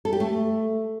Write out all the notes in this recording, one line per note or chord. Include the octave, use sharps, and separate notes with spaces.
A4
G4
A3